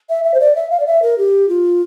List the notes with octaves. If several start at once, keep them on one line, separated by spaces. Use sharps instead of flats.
E5
E5
C5
D5
E5
F5
D5
E5
A#4
G4
F4